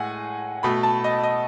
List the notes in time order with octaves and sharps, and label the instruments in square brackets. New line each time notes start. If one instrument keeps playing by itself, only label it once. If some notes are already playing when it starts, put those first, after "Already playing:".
Already playing: [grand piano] A2 G#3 F#5 G#5
B2 A3 B5
A5
D#5
D#5